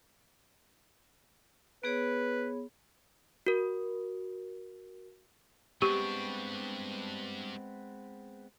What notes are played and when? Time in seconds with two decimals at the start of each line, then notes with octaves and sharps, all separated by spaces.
1.84 B3 G#4 B4 C#5
3.46 F#4 A#4
5.82 G2 G#3 B3 C4 D4 G4 C#6